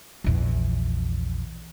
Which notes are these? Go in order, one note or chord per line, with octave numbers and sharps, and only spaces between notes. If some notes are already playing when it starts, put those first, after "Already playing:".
A#1 E2